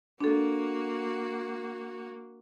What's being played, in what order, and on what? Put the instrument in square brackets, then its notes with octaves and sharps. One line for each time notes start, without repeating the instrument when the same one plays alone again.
[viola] A#3 F#4 [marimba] D4 A4